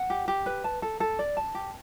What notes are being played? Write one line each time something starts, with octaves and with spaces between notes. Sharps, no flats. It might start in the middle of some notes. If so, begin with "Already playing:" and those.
Already playing: F#5
G4
G4
B4
A5
A4
A4
D5
A5
G4